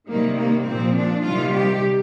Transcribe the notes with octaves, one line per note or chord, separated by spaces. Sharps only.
C3 D#3 G3 A#3
A#3
A#2 F3 C4
D4
C3 D#3 G3 F4
G4